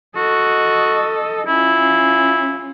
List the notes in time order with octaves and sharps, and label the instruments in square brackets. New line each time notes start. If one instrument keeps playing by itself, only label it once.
[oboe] F#4 [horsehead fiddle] A4 D#5
[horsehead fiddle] C#4 F4 [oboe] E4